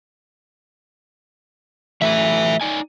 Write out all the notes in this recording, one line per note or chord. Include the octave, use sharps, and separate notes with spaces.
E3 F#3 A3 B4 E5
D#4 D5 G#5